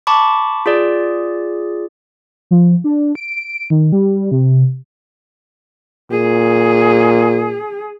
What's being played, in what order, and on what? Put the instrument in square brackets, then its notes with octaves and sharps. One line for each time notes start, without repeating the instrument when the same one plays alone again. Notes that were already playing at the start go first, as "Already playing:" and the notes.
[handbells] A5 B5 C#6 D6
F4 G#4 D5
[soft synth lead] F3
D4
D7
D#3
G3
C3
[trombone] A#2 [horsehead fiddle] G#4